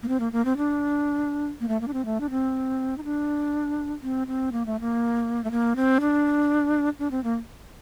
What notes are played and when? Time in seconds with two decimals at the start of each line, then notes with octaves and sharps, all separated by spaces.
0.03 A#3
0.08 C4
0.20 A#3
0.33 A#3
0.45 C4
0.57 D4
1.60 A#3
1.68 A3
1.81 A#3
1.88 D4
1.93 C4
2.05 A3
2.20 D4
2.30 C4
2.98 D#4
3.04 D4
4.03 C4
4.27 C4
4.52 A#3
4.66 A3
4.80 A#3
5.44 A3
5.51 A#3
5.76 C4
6.00 D4
6.99 D4
7.11 C4
7.24 A#3